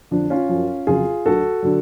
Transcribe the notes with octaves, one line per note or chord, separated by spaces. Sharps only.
F2 D3 F3 D4
C#4 F4
F#2 F3
F2 C#3 F#3 F4 G#4
D2 D3 F#3 F#4 A4
D3 F#3